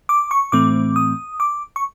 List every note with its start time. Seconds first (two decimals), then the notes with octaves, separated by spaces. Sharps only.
0.09 D6
0.31 C#6
0.52 A2 E3 A3 C4 D6
0.96 D#6
1.40 D6
1.76 C#6